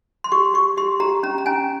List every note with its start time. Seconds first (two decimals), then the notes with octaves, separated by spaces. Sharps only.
0.24 C6
0.32 G4 C#6
0.54 G4 C#6
0.77 G4 C6
1.00 G4 A#5
1.23 C#4 A#5
1.38 A#5
1.46 C#4 G#5